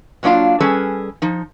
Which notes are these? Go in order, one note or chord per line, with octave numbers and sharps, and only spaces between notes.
A2 F#3 A#3 D4 F4 F5
G3 C#4 G#4 A4 B4
F3 D#4